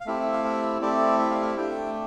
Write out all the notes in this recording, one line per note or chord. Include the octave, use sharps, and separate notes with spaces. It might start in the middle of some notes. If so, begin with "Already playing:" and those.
F5
A3 C4 E4 G4 E5
F5
E5
A3 C4 E4 G4 D5
E5
F5
E5
A3 D4 G4 G5